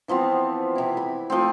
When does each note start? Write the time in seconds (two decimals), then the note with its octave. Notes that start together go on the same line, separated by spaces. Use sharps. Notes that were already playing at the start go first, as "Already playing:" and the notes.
0.08 E3 F3 B3 C4
0.75 C3 E4
0.97 B5
1.30 F3 A3 C4